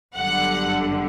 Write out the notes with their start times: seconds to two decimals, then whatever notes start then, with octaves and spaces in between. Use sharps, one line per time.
0.14 G1 F#2 D3 G3 F#5